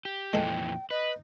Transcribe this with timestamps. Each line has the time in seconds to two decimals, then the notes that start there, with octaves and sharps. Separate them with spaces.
0.05 G4
0.33 F2 A#2 E3 G#3 A4 G5
0.91 B4 D#5